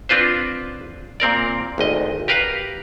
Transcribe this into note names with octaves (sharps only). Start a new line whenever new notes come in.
C4 D4 F4 B4 C5
A#2 C4 A#4 D5
G#1 D2 D#5
G4 A#4 B4 F5